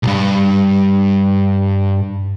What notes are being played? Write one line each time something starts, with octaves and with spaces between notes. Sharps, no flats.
B1 G2